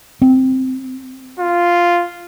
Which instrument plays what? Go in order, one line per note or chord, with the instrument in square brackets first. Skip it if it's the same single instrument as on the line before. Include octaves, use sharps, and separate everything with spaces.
[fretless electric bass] C4
[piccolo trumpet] F4